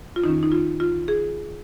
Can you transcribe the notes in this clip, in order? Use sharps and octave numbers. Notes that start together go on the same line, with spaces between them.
F4
F2 D#3 C#4 D#4
D#4
F4
F4
G#4